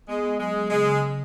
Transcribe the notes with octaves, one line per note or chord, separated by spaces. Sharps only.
G#3 B3
B3
F#3 G#3
F#3
C#3 G#3
C#3
C#3